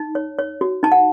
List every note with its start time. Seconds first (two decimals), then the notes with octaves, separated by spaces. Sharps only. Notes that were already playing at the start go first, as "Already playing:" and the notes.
Already playing: D#4
0.15 C#5
0.39 C#5
0.61 F#4
0.83 D#4 A5
0.92 F#5